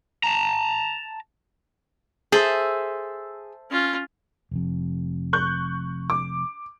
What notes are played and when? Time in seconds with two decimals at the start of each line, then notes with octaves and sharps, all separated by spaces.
0.24 A5 A#5
2.32 G#4 A4 C5 E5
3.71 C#4 F4
4.51 F1 F2
5.33 C#6 F#6 G6
6.10 D6